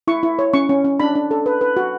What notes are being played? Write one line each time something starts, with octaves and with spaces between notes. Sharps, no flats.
E4 C#6
E4
C#5
C#4 C#6
C#4
C#4
D4 B5
D4
A4
B4
B4
F#4